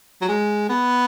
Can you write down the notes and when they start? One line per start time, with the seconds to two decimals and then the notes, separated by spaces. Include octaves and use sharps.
0.21 F#3
0.28 G#3
0.69 B3